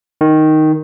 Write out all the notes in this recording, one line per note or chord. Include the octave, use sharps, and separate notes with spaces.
D#3